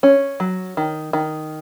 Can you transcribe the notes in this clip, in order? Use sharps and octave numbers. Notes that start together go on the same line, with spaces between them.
C#4
F#3
D#3
D#3